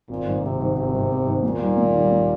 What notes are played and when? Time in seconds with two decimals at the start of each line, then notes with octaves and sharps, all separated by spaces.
0.09 G#1 A#2
0.26 G#2 D#3
0.43 G#1 C3
0.59 G#2 D#3
0.76 G#1 C3
0.93 G#2 D#3
1.10 G#1
1.27 G#2 D#3
1.43 D#2 A#2
1.60 D#3 G3
1.77 D#2
1.93 D#3 G3
2.10 D#2